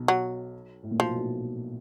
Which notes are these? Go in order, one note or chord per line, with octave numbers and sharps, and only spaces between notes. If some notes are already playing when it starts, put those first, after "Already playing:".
Already playing: B1 B2
F#3
A2
A#2
B1 B2 F3
B1 B2